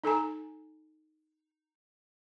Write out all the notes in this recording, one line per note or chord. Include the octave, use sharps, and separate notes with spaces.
D#4 A4 G#5 A#5